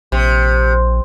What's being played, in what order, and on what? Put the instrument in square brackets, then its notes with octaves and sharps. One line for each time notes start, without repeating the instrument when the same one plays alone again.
[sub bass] A#1 [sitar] C3